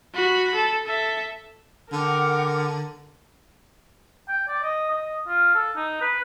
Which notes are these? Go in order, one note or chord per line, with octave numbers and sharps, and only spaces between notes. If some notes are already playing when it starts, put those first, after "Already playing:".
F#4 B5
A4
A4 E5
D3 A#4 F#5 G5 D6
G5
D5
D#5
D#5
F4
A4
D#4
B4